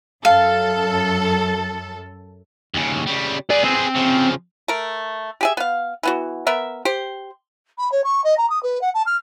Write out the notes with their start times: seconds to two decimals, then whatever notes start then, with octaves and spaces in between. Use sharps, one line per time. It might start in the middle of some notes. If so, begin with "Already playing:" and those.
0.25 F#2 A4 F5
2.74 D#2 C#3
3.06 C#3 G3
3.50 G#4 B4 D5
3.64 C4
3.95 C#3 F3
4.68 A3 A#4
5.41 G4 G#4 E5
5.57 B3 F5
6.03 E3 B3 F#4
6.47 B3 A#4 E5
6.85 G4 C5
7.78 B5
7.91 C#5
8.04 C#6
8.24 D#5
8.37 A#5
8.49 D#6
8.63 B4
8.81 F#5
8.94 A5
9.06 F6